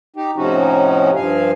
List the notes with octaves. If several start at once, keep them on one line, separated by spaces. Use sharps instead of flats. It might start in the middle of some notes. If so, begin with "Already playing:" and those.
D#4 G4
A2 C3 F3 C#4 D#4 F#4
G2 F3 F5 G#5